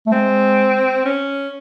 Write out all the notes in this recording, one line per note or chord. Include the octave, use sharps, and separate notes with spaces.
A3
G#3 C4
C#4